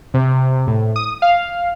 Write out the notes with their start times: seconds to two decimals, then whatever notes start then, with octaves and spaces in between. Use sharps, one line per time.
0.14 C3
0.67 A2
0.96 D#6
1.22 F5